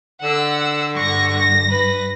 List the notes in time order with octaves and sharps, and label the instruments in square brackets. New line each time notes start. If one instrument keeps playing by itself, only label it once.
[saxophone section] D3 [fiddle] F#5 E6
[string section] G2 A#6 [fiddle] C#6
[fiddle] B4